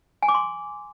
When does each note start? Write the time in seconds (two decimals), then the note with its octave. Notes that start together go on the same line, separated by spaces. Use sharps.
0.22 G#5
0.28 D6
0.34 C6